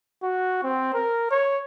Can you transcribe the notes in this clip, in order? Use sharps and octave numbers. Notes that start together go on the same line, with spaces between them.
F#4
C4
A#4
C#5